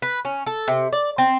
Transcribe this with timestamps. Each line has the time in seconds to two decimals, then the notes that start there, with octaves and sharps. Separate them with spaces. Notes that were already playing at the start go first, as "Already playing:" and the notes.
0.02 B4
0.25 C#4
0.46 A4
0.68 C3
0.93 D5
1.18 C4